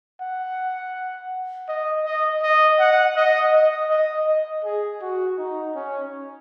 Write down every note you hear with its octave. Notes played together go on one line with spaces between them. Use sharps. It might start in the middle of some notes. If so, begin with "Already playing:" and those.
F#5
D#5
D#5
D#5
F#5
D#5
D#5
D#5
D#5
G#4
F#4
D#4
C#4